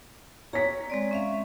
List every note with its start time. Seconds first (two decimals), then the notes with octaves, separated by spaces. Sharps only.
0.53 C#5 A#5 B6
0.90 G#3 C4 D5
1.11 C#4 E5 F5